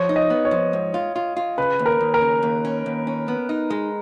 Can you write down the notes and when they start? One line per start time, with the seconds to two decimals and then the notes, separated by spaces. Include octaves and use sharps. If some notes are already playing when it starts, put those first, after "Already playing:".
Already playing: F3 C#5
0.09 D#4
0.16 D#5
0.30 B3
0.45 C#5
0.51 F3
0.73 G#2
0.94 F4
1.16 F4
1.37 F4
1.58 C#3 B4
1.79 D#2
1.86 A#4
2.01 D#2
2.14 A#4
2.22 C#3
2.43 D#2
2.65 C#4
2.86 D#2
3.07 C#4
3.28 B3
3.49 D#4
3.70 G#3